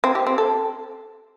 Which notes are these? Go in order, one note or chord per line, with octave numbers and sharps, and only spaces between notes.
C4
G4
C4
A4